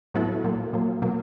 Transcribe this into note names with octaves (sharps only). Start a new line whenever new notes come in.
A2 F#3 B3 E4 A4
A#2 F#3 A#3
A#2 F#3 A#3
B2 F#3 A#3